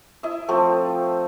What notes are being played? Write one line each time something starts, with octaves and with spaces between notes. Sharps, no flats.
E4 D#5 E5
F3 A3 C4